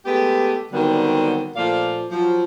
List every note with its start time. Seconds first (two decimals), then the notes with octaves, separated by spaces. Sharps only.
0.06 G#3 A3 B3 G4
0.72 D3 D#3 F#3 G3 B3 C4
1.56 A#2 F3 A3 D5 F5
2.11 F3 F#3